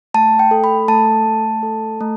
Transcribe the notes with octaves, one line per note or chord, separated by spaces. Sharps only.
A3 A5
G5
A4
B5
A3 A5
A3
A4
A3